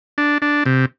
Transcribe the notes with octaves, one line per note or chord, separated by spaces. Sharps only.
D4
D4
C3